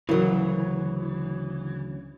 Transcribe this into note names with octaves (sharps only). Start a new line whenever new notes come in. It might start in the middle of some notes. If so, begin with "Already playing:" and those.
D2 C#3 E3 F#3 E4 A#4